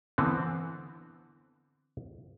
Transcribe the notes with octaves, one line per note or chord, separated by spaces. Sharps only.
D3 E3 B3 C4